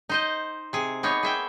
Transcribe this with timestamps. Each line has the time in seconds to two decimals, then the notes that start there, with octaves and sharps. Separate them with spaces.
0.09 D#4 C5 D#5
0.73 C3 G#4
1.03 A#3 B3 D#4 C#5
1.23 G#4 E5 G5